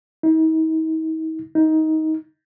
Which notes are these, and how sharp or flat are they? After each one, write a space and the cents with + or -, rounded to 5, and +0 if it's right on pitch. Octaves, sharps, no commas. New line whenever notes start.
D#4 +45
D#4 +20